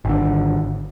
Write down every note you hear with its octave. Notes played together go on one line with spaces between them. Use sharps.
G#1 D3